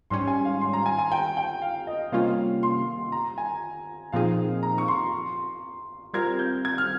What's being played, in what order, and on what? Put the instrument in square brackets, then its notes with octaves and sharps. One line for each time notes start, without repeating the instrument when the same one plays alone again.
[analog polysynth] G#2 G3 C#4 [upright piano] C6
[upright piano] G#5
F5
C6
A#5
G#5
G#5
G5
G5
F5
D#5
[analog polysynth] C3 G3 A#3 C#4 F4 [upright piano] F5
[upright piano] C6
A#5
G#5
[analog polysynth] A#2 F3 C4 D#4 G#4 [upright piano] F5
[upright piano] A#5
C#6
C6
[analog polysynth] G3 C4 F4 A#4 [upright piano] G#6
[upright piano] G6
G#6
F6